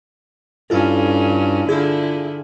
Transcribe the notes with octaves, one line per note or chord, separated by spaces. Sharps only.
G2 C#4 E4 F4 A4
D3 E4 F4 G#4